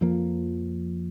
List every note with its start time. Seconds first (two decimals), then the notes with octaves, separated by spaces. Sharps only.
0.01 F2 F3 A#3